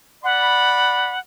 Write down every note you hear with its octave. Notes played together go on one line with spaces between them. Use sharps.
D5 F#5 B5